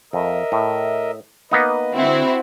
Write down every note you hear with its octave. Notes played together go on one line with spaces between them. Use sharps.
F2 A#4 D#5 E5
A2
A#3 B3 D#4 B4 D#5
D3 C4 E4 F#4